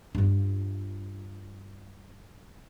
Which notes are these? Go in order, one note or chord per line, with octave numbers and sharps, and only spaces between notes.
G2 F4